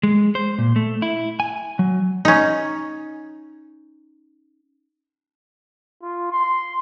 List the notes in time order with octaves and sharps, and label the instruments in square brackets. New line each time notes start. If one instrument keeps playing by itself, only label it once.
[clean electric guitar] G#3
C5
A#2
A3
E4
G#5
F#3
[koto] C#4 D#4
[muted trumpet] F4
C6